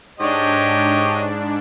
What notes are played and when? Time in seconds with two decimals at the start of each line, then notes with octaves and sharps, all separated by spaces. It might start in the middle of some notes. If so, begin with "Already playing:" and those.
0.20 G#2 D4 G4 C#5 D#5